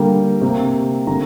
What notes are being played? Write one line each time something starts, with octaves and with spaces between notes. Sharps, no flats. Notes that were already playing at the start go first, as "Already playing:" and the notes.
Already playing: D3 G3 A#3 G5
C3 A#3
D3 A#3 A#5